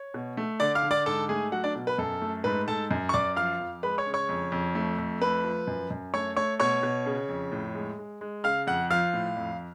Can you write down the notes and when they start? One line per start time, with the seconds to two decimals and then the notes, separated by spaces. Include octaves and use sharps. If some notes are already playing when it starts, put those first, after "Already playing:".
Already playing: C#5
0.14 B2
0.37 A3
0.60 D3 D5 D6
0.75 F5 F6
0.83 D3
0.91 D5 D6
1.06 G#2 A4 A5
1.29 A3 G#4 G#5
1.52 F#3 F#4 F#5
1.64 D4 D5
1.75 B2
1.87 B4
1.98 F#2 A4
2.22 A3
2.44 G#2 B4
2.68 G#2 A4 A5
2.91 F#2
3.09 C#6
3.14 F#2 D5 D6
3.36 F3 F5 F6
3.60 F2
3.83 G#3 B4 B5
3.98 C#5 C#6
4.06 C#3
4.14 C#5 C#6
4.29 F2
4.52 F2
4.75 A3
4.98 F2
5.22 A3 B4 B5
5.44 F3
5.67 F#2
5.91 F#2
6.14 A3 C#5 C#6
6.37 A3 C#5 C#6
6.60 B2 C#5 C#6
6.83 B2
7.06 C#3
7.29 F2
7.52 A2
7.75 G#3
7.99 G#3
8.21 G#3
8.44 C#3 F5 F6
8.67 F2 F#5 F#6
8.90 F3 F5 F6
9.14 A2
9.37 F2